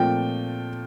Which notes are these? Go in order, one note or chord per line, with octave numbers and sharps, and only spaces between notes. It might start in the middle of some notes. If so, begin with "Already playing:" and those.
Already playing: A#2 F3 A3 C4 G5